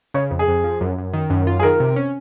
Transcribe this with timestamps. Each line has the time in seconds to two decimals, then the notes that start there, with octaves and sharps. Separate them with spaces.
0.14 C#3 C#5
0.31 F2
0.39 G#4
0.48 F2
0.64 F3
0.81 F#2
0.98 F#2
1.13 D#3
1.30 F#2
1.47 F4
1.60 G#4
1.63 D#3 A#4
1.80 C3
1.96 C#4